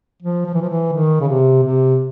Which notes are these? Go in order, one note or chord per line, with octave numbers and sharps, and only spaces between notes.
F3
F3
E3
F3
E3
D#3
C#3
C3
C3